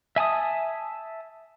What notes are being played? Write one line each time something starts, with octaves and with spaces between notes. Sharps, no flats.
E5 G#5 A5 D#6